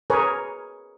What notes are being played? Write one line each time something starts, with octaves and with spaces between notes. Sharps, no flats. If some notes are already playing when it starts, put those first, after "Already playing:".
G#4 A#4 B4 C#5